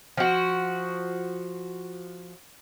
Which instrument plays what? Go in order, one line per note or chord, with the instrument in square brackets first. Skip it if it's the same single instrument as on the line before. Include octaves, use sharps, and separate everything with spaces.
[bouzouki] F3 F#4